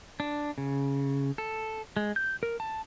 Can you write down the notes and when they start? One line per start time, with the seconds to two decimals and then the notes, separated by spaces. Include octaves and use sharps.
0.20 D4
0.58 C#3
1.38 A4
1.97 G#3
2.16 G6
2.43 A#4
2.60 A5